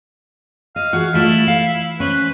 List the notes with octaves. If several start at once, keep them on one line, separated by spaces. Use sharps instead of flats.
D#5 F5
E3 F#4 G#4
G3 A3 E4 F4
F5
C#4 B4 C5